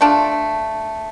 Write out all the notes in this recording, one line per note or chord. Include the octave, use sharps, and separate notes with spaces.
A3 D4 F4